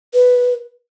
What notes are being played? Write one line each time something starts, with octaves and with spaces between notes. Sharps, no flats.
B4